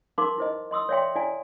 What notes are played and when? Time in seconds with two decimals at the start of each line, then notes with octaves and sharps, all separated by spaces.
0.18 D#4 A#4 F5 C6 D6
0.38 E4 C5 D#5
0.71 D#5 C6 D#6 E6
0.89 C#5 D5 E5 F5 G5 C6
1.16 E4 D5 F5 G#5